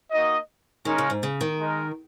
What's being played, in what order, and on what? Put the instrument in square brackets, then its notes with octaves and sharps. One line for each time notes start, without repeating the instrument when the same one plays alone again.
[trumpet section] A#3 D#4 F#4 D#5
[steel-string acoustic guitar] D#3 [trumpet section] G#3 C#4 A#4
[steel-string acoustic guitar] C#3
G#2
C#3
D#3
[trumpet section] G#3 D#4 A#4